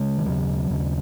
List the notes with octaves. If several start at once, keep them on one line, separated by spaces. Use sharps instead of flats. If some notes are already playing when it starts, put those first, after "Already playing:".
Already playing: C#3 G#3
D#3
D#2 C#3 F#3
D#2 C#3